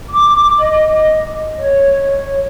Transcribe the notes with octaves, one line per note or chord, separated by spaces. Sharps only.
D6
D#5
C#5